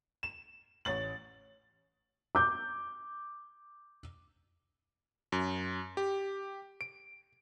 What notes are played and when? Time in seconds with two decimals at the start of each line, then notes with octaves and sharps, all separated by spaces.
0.23 E7
0.85 A1 C#5 A6 F#7
2.35 D6 G6
5.32 F#2
5.97 G4
6.81 D7